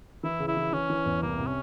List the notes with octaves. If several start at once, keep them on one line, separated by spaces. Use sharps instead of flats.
E3 E4
C#3
E4
E3
E3 C#4
E3
E2
C2 A#3
C3
C#4